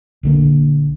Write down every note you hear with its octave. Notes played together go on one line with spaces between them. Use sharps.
A#1 D3 A#3